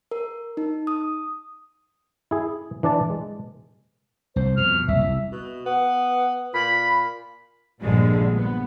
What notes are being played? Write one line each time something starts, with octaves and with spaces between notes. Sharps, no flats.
A#4
D#4
D#6
E4 G#4
E3 D4 D5 A5
G#3
C2 C5
F2 B2 F6
F#1 C2 F2 E5
C2
B2
B3
A#2 B5
A#1 G2 D3 F3 G#3
B3